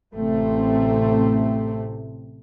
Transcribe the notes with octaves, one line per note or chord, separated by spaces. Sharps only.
A1 C3 A3 C4